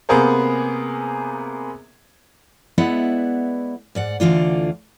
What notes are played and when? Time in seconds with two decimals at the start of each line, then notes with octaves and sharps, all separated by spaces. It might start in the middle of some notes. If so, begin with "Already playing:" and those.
0.09 C3 A#3 B3 G#4 A#4 C5
2.78 G#3 B3 E4 D5 E5 F#5
3.95 G#2 D5 F#5
4.20 D2 D3 E3 F4 D5